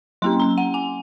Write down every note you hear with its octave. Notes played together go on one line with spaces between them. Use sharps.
F#3 A#3 C#4 C6
A#5
F#5
G#5